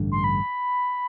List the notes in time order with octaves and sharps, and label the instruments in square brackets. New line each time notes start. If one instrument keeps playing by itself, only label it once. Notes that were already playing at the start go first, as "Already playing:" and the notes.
Already playing: [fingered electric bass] A1 G2 D3
[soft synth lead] C6
B5